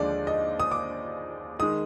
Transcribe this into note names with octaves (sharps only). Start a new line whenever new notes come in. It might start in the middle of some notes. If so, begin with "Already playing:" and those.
Already playing: D#2 D3 F3 G#3 D5
D#5
D#6
D6
D#3 G#3 D#6